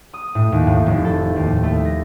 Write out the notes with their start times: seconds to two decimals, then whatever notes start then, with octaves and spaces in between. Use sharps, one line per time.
0.13 D#6
0.35 A2
0.52 D#2
0.67 A2
0.86 F1
1.05 A4
1.36 D#2
1.63 A3
1.85 A#6